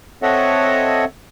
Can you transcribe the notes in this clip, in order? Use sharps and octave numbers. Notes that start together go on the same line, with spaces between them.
C4 A4 C#5 D#5 E5 F#5